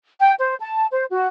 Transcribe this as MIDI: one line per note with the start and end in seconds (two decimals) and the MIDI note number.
0.22 0.33 79
0.38 0.55 72
0.60 0.86 81
0.91 1.04 72
1.12 1.28 66